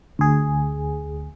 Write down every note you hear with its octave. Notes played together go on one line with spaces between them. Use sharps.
D2 G#4